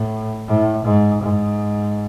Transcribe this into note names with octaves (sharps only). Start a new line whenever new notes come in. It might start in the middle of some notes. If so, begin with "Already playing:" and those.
Already playing: A2
A2
G#2
G#2